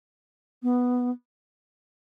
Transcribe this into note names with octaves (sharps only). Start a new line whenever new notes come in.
B3